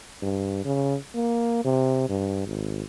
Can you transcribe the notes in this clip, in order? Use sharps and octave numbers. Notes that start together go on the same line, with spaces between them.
G2
C#3
A#3
C3
G2
G#1